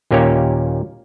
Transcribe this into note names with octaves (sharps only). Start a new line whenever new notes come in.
D#2 A#2 A#3 C#4 G4 C#5